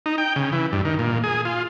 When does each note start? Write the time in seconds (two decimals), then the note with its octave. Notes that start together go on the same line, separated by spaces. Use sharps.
0.06 D#4
0.18 G5
0.36 C#3
0.52 E3
0.73 G2
0.85 D#3
0.99 A#2
1.24 G#4
1.45 F4